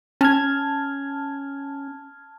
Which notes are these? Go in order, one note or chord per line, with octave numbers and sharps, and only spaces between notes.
C#4 A5 F6 G#6